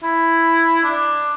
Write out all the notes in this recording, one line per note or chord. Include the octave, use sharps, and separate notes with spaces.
E4
D4